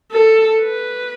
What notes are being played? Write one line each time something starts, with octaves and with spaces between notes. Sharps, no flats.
A4
B4